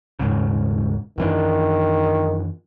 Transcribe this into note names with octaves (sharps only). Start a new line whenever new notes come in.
D#1 G#2 C#3
F#2 D#3 E3 D4